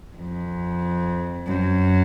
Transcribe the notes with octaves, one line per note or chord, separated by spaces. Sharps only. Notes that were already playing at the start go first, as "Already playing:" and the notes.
F2
F#2